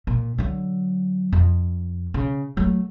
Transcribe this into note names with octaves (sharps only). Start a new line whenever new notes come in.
A#2
D3 F#3
F2
C#3
F#3 A3